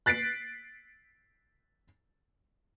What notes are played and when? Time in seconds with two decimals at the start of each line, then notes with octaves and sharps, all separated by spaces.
0.06 F#6 A6 B6 C7 D7